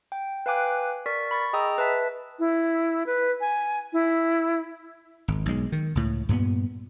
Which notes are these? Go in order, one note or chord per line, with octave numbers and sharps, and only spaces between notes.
G5
B4 F5 G5 G#5 D6 F#6
A#4 D5 C#6 B6
B5 C#6 A6
G#4 D#5 G5 A#5 D#6 E6
B4 E5 A5 B6
E4
B4
G#5
E4
G#1
B1 G#3
D#3
C#2 A2
G2 A#2 G#3 B3